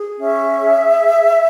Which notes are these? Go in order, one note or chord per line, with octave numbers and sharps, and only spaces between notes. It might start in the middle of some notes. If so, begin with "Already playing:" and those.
Already playing: G#4
C#4 E5
G#4